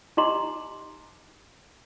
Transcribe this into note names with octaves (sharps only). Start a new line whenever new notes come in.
D#4 G4 D#5 A#5 C6 D6